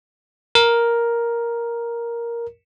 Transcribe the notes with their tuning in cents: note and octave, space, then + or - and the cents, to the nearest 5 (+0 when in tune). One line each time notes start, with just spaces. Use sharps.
A#4 +5